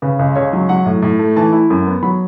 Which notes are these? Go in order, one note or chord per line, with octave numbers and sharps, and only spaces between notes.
C#3 B4
C#2
C#2 C#5
F#3
F#3 F#5
A2
A2
A3
E3 A5
E4
F#2
B3
F#3 B5